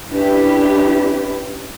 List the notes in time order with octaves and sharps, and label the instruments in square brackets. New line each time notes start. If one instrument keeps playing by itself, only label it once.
[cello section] C#4 D4 E4 G4 B4